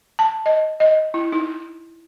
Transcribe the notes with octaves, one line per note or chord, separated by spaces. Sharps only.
A5
D#5
D#5
E4
D#4